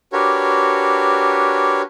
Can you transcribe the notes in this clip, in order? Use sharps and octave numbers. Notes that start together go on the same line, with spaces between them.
D4 F#4 G4 A#4 B4 C#5